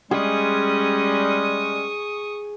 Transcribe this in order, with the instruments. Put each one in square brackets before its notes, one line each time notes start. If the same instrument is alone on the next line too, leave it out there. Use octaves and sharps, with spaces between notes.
[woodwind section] G3 G#3 C#4 [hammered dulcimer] G#4 [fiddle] C#6 D#6